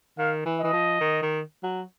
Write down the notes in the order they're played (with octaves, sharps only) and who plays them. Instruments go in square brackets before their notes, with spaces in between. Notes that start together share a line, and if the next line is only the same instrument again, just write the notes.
[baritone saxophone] D#3 [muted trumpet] F5
[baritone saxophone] E3
[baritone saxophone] E3 [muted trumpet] D#5
[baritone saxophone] F3
D#3
D#3
F#3